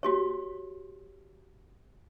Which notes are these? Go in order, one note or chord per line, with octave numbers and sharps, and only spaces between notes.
F#4 G4 C#5